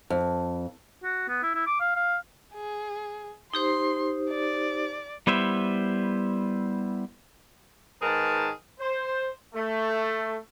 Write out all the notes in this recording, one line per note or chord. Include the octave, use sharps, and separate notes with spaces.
F2
F#4
B3
E4
E4
D6
F5
F5
G#4
D#4 G4 C5 C6
D5
G3 B3 E4 C5 E5
G#2 D#3 G#4 A#4 B4 A5
C5
A3